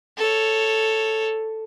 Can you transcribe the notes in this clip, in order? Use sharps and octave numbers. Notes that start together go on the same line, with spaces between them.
A4 C#5